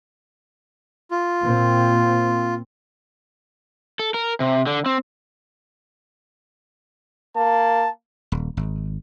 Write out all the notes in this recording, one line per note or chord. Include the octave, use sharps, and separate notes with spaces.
F4
A#2 A#3 C4
A4
A#4
C3
D3
C4
A#3 A5
D#1
G#1